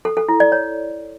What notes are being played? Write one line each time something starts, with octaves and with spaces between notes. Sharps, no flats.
A4
A4
E4
D5
C#5